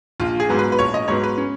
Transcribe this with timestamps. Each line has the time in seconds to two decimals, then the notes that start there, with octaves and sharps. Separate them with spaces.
0.20 A#1 F4
0.40 G#4
0.49 G#2 F#3 B3
0.59 B4
0.72 B4
0.79 A#1 C#5
0.94 D#5
1.08 G#2 F#3 B3 C#5
1.23 B4
1.37 C#4